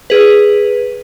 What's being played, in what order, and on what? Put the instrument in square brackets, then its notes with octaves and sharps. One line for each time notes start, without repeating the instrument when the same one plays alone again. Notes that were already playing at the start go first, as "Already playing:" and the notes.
[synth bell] G#4 B4